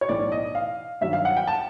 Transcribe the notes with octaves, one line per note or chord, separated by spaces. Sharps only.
C#5
B1 A2 E3 D5
D#5
F5
G2 D#3 F#3 E5
F5
F#5
G5
A5